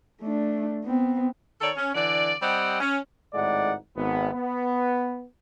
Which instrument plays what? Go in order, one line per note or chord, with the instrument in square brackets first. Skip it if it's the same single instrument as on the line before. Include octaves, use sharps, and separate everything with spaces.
[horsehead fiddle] A3 D4
B3 C4
[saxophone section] D#3 A4 C#5 D5
C#4
D3 E3 D5
G3 C4 D5 D#5 F#5
C#4
[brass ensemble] G#1 A2 G#3 D#4 D5 F#5
G#1 B3
B3